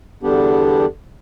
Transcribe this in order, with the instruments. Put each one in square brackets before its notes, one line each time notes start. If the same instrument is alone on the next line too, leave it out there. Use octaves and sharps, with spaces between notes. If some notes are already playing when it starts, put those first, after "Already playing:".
[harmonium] E2 D3 G3 B3 D4 G4